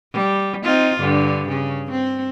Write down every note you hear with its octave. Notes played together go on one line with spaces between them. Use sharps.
G3
C4 D#4 F4
G2 D3
C#3
C4